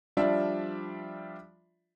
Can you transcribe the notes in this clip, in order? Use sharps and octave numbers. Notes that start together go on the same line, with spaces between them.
F3 G3 D4 F4 D5 E5